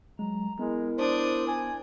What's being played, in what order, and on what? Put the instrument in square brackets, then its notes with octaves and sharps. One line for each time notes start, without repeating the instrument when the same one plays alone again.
[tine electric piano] F#3 G#3 [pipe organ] A#5
[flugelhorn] G#3 [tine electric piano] B3 [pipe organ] E4 A#4
[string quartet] D4 D#6 [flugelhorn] C5
[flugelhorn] G#5